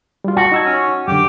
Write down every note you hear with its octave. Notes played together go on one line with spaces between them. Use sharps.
G3 F4
F#4 A5
D#4 E6 G#6
C#4
F#2 D3 G4